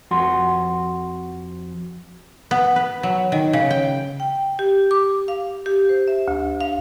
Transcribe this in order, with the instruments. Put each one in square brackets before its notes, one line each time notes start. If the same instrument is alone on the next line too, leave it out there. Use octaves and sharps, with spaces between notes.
[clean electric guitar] F2 F#4 C6
[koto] B3
B4
F#3
D#3
C#3
G5
[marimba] G5
G4
D6
F5
G4
C5
E5
D2
F5